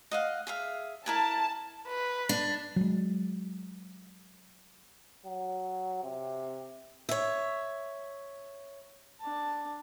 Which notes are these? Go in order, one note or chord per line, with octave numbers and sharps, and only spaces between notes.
D#5 F5 F#5
G#4 E5 F5
E4 A#4 G#5 A5
B4
D4
F#3 G#3
F#3
C3
C#5 E5
D4 A5